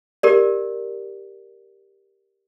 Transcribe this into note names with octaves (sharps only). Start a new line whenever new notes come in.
G4 A#4 D5